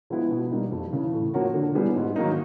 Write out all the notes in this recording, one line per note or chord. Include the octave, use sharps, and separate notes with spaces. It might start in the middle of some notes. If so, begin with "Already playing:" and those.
F3 G#3 B3 E4
B2
G3 A#3 D#4
F2
C#3 E3
A2
F3 A#3 C#4 F#4
D3
G3 B3 E4 G#4
G#2
D#3 F#3 A#3 D#4